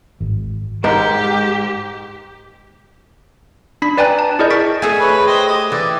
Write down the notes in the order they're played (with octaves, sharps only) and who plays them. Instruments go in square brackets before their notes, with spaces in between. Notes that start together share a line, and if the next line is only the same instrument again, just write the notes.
[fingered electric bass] G#1
[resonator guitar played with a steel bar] G#2 [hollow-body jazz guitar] G#3 A#4 [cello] G4
[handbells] D4 B5 B6
B4 D5 G5 G#5 A#5 F#6
A5
E4 G#4 A#4 D5 D#5 G6
C#6 A6 B6 D7
[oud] A3 G#4 [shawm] G#5
[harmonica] B4 C#5
[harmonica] C5 G5 [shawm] D#5
[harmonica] G4 [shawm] D#6
[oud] E3 [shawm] D5